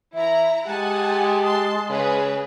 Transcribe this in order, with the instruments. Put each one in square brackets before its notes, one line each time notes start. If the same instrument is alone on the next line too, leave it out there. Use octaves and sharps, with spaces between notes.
[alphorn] E3 [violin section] E4 A#5 [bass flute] E5
[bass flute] G#3 [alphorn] G4 [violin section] F#5 G#5 A5
[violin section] A5 C6
[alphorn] C#3 [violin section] G#4 B4